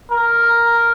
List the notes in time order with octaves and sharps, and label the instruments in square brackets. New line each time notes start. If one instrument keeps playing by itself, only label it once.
[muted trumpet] A#4